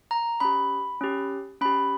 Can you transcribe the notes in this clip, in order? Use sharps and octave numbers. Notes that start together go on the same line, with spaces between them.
A#5
C#4 G4 B5
C#4 G4
C#4 G4 B5